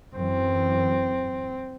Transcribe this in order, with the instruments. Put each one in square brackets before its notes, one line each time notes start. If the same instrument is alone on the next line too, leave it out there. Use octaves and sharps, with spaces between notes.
[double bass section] F#2 E3 [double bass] C4